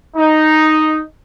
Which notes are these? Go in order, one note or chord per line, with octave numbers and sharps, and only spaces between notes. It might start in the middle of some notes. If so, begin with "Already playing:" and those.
D#4